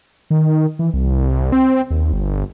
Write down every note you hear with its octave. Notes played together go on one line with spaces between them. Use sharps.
D#3
E3
C2
C4
D#2
G1